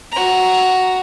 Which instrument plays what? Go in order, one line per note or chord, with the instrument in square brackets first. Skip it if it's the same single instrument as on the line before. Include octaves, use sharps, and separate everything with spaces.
[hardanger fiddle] F#4 A#5